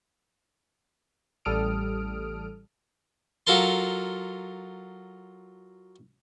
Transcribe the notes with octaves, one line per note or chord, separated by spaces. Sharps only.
A1 G3 A4 D#6 F6 D7
F#3 F4 A4 A#4 A5 C6